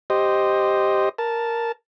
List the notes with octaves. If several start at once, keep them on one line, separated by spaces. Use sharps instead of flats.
G4 C5 D#5
A#4 A5